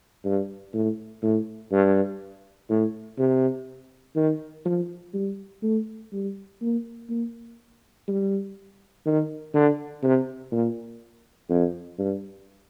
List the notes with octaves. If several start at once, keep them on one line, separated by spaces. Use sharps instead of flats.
G2
A2
A2
G2
A2
C3
D#3
F3
G3
A3
G3
A#3
A#3
G3
D#3
D3
C3
A#2
F2
G2